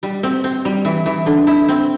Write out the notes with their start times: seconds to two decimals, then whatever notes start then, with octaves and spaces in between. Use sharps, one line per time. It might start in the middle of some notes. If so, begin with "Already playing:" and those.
0.03 G3
0.23 C4
0.44 C4
0.65 G3
0.85 E3
1.06 E3
1.26 D3
1.47 E4
1.68 C4